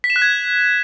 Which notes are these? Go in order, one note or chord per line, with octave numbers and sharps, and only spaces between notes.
B6
E7
F#6
G#6